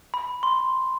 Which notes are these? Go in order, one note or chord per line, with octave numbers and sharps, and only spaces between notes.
B5
C6